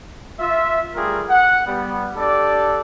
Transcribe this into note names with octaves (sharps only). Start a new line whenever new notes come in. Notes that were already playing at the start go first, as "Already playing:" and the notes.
F4 E5
G3 A3 F4 G#4 A#4
F#5
G3 B3
D4 G4 A4 D5